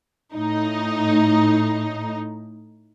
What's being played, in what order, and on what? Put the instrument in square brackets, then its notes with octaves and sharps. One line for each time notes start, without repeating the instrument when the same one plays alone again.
[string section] A2 D#4